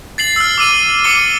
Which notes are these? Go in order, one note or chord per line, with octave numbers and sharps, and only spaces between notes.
A6 C7 F#7
E6 F6
D6 E6 D#7
D6 C#7 G7